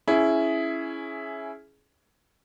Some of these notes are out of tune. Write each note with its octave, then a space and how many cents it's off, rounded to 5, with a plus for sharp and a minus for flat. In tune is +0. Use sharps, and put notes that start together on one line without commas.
C#4 +0 E4 +5 G#4 +15